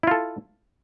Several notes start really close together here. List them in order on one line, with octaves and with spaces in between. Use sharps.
E4 F4 A4